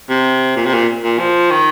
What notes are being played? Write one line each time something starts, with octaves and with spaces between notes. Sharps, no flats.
C3
A#2
C3
A#2
A#2
F3
D#3